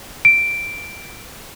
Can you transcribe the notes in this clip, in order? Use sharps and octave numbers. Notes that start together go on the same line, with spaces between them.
D7